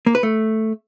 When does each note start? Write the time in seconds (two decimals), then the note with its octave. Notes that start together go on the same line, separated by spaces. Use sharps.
0.06 A#3
0.15 B4
0.23 A3